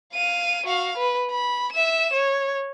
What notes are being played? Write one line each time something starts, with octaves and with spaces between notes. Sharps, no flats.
F5 D#7
F#4 F5
B4
B5
E5 E7
C#5